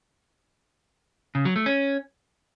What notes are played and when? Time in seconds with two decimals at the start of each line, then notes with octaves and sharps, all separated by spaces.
1.35 C#3
1.45 F#3
1.56 A3
1.66 C#4